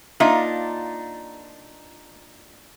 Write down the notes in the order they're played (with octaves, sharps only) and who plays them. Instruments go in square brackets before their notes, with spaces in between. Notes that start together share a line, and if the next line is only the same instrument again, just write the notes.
[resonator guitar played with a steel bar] A#3 D4 D#4 F4 E5